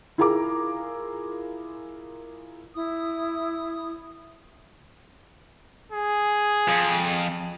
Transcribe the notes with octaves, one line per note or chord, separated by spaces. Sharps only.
E4 F4 G#4 A#4 A#5 D6
E4 D#6
G#4
F2